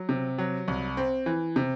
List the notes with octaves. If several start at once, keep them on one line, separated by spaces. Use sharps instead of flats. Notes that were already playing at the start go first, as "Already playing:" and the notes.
Already playing: F#3
C3
F#3
C2
C4
E3
C3